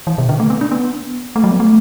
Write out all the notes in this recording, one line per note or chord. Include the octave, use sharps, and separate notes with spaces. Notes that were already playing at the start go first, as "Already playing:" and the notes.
E3
B2
D3
A3
B3
D4
B3
A3
F#3
B3
A3